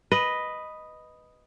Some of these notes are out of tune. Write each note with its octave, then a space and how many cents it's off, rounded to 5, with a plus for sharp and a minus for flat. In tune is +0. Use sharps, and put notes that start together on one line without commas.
B4 +0 D#5 +0